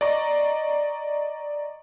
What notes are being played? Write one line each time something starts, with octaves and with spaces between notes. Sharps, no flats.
D5 D#5 A#5 C#6